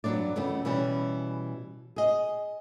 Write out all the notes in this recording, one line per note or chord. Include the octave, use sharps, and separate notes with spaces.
G2 E3 F#3 C4 D4 D5
F2 C#3 E3 A3 B3
B2 E3 G3 C#4
G#4 D#5